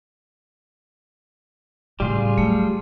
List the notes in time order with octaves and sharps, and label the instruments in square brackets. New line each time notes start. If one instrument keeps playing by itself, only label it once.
[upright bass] A2 C#3 [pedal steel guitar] G3 F4 G#4
[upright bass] F#3 [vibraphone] A3